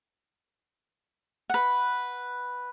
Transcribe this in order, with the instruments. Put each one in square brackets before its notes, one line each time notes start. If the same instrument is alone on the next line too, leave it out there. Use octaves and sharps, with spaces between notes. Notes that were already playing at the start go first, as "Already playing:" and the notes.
[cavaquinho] B4 F#5